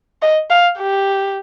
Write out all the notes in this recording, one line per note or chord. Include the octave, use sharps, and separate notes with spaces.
D#5
F5
G4